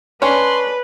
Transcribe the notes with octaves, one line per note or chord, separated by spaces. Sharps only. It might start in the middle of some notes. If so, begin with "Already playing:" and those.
C#4 D4 B4 C#5 C6